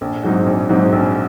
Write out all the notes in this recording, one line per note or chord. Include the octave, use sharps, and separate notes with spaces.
A#1
G#2 F#3 C4 D#4
A#1
G#2 F#3 C4 D#4
A#1